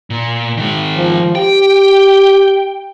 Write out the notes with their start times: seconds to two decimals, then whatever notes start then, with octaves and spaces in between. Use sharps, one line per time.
0.10 A#2
0.57 D#3 G#3
0.96 F3
1.35 G4 G5